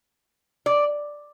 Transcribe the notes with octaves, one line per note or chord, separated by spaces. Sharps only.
D5